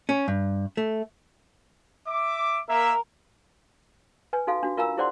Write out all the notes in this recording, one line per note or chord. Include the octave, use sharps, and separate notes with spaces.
C#4
G2
A3
E5 D6
A#3 A#4 E5
B4 G#5
D#4 F#4 A4 F5
D4 F#4
F4 A#4 F5 G#5 A#5 E6
E4 G#4 C5 D5 F#5 C6